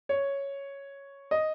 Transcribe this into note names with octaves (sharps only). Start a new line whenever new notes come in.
C#5
D#5